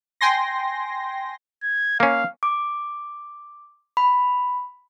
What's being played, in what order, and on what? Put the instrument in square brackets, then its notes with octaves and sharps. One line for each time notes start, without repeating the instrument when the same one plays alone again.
[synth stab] G5 G#5 C6 A#6
[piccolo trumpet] G#6
[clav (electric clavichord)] A#3 C#4 [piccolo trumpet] F5
[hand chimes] D6
B5